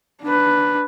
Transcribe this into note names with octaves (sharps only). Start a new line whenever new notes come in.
D4 B4